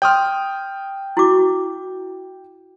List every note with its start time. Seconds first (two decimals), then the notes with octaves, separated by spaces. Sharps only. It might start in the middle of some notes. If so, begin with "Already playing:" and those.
0.02 C#5 G5 C6 D#6 F6
1.17 E4 F#4 D6